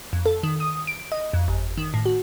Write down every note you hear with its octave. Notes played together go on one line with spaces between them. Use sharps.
F2
A4
D#3
D#6
D7
D#5
F2
G1
D#3
A2
F#4